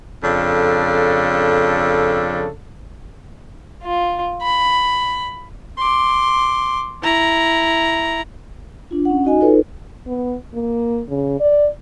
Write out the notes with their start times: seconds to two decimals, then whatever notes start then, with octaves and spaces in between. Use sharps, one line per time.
0.24 F2 C#3 D4 A4
3.83 F4
4.42 B5
5.79 C6 D6
7.03 E4 A#5
8.91 D4 F4
9.05 C#4 F#5
9.24 D#4 F#4 D#5 G#5
9.40 D#4 F4 A4 B4 C#5
10.07 B3
10.54 A#3
11.09 C#3
11.40 D5